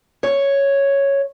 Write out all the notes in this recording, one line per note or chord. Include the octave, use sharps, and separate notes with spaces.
C#5